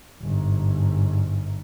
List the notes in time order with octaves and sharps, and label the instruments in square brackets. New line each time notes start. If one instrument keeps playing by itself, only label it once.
[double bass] G1 G#2